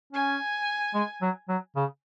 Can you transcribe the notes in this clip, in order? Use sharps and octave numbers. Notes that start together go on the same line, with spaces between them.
C#4 G#5
G#3
F#3
F#3
C#3